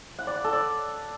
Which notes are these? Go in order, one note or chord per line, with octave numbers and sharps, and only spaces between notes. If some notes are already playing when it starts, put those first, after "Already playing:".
F#5
D5
F#5
A4
D5